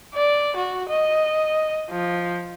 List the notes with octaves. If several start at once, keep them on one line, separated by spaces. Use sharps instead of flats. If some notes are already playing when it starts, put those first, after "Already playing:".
D5
F#4
D#5
F3